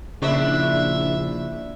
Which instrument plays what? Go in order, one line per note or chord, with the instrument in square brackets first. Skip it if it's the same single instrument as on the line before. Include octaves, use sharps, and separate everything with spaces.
[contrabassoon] A#1 [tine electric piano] C#3 C#6 [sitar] C4 D4 E4 [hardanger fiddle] E5